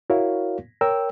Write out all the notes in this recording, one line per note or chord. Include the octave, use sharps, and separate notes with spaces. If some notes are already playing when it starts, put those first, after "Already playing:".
E4 F#4 A#4 C#5 F5
A#4 C#5 G5 E6